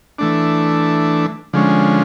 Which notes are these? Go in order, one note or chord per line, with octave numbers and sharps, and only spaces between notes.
E3 A3 D4
D3 F3 G#3 C#4